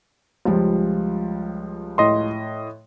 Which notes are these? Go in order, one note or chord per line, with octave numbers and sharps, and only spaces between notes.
C#2 F3 G3
A2 D#5 C6